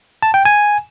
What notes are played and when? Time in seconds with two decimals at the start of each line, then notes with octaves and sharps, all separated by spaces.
0.22 A5
0.34 G5
0.45 G#5